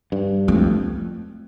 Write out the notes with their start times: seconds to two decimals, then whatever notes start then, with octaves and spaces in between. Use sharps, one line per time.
0.12 G2
0.48 F2 A3